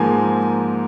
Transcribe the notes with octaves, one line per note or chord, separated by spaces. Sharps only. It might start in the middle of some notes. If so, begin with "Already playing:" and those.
Already playing: G#2 F3 A#3 G#5